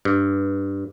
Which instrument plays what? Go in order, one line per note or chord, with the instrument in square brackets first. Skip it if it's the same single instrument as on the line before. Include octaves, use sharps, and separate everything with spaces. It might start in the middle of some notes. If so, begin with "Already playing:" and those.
[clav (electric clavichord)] G2